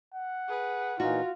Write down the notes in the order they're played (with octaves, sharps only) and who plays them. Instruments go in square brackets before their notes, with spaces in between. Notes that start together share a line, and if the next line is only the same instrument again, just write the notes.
[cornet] F#5
[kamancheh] G#4 B4
[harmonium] A#2 E3 D#4 [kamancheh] F4 F5 [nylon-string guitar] F#4